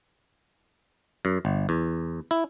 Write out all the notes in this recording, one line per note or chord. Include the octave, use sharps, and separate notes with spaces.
F#2
G1
E2
E4